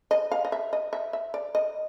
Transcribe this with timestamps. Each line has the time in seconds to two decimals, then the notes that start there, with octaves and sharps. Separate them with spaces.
0.11 D#5
0.31 F5
0.45 D#5
0.52 E5
0.73 D#5
0.93 E5
1.13 E5
1.34 D5
1.55 D#5